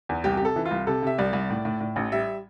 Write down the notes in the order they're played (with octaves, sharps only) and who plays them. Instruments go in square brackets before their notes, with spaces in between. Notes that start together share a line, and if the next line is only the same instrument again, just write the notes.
[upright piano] E2
C2 G4
G4
C3 A4
E3
F4
C2
C3 A4
C3 E5
C2 D5
C2
A2
A2
A2
A1
G3 E5